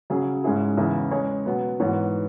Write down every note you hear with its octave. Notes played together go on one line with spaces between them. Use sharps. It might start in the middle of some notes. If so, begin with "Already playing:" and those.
C#3 F#3 C#4 G#4
G#2 G#3 C#4 E4 G#4
E2 C#3 E3 C#4 E4
G#3 C#4 G#4 C#5
B2 F#3 B3
G#2 E3 B3 F#4 C#5